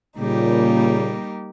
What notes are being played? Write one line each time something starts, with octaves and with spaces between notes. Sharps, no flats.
A#2 C#3 G3 A#3 D#4 G4